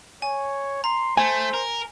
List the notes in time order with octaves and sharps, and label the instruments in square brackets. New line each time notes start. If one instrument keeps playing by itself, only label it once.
[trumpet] C#5 [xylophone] G#5
[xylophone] A#5 [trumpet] C6
[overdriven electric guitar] A3 [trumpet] C5 [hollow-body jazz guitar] G#5
[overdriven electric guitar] A#4